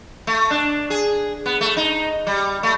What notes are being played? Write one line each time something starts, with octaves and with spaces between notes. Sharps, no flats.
A3
D4
G#4
B3
A3
D#4
G3
A3